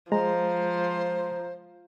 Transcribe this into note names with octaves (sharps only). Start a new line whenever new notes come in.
F3 G#3 C5 A#5